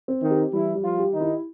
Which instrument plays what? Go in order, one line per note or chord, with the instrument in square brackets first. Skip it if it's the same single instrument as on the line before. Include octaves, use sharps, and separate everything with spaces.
[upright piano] C4
[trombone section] D#3 D#4
[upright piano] G4
[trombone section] E3 E4 [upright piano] G3
[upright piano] G3
[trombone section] F3 F4
[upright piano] G4
[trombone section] D#3 D#4
[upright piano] E4